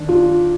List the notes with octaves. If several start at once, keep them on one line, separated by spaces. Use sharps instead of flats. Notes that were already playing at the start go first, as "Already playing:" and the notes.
Already playing: D#3 D4
F4